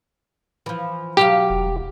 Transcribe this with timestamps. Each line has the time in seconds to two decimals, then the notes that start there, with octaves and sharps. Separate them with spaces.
0.66 E3 F3
1.17 B2 F#3 G4 F5
1.50 E1